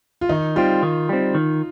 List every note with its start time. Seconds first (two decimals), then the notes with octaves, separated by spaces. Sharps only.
0.21 F4
0.29 D#3 D#4
0.56 G3 C4 F4
0.83 D#3
1.09 G3 C4
1.35 D#3